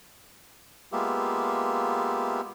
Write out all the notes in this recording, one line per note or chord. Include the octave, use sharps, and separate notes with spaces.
G#3 A#3 B3 F4 G4 E5